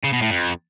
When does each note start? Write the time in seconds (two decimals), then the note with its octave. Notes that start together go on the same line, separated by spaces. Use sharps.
0.04 C#3
0.13 B2
0.22 A2
0.31 F2